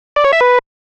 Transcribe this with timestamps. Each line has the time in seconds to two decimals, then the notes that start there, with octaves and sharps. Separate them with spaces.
0.16 D5
0.24 C#5
0.33 E5
0.41 B4